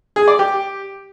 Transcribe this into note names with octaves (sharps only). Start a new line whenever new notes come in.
G#4
D5
G4